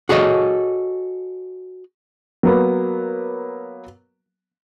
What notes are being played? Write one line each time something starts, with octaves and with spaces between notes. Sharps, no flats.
F#4 G#4 A4 C#5 D#5
F#3 A#3 B3